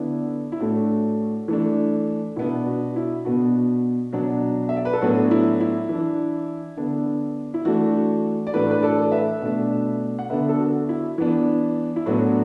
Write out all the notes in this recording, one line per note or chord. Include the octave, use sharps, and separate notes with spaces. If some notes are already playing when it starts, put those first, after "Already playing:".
Already playing: D3 B3 D4 E4
E4
A2 A3 D4 F#4
E3 A3 D4
B2 B3 D4 E4
F#4
E4
B2 B3 D4 F#4
B2 F#3 D4
E5
D5
B4
A4
A2 F#3 B3 D4 F#4
E4
E4
E3 D4
D3 B3 D4
E4
E3 A3 D4 F#4
D5
A2 E3 A3 D4 F#4 B4
B4
A4 D5
B4 E5
B2 A3 D4
F#5
D3 B3 D4 B4 E5
A4
F#4
E4
E3 B3 D4
E4
A2 F#3 B3 D4 F#4